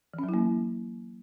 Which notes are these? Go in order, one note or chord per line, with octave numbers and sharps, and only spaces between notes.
E3
C#4
F#3
E4
A#3